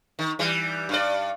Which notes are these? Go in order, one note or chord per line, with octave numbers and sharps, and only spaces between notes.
D#3
E3 G3
G2 D5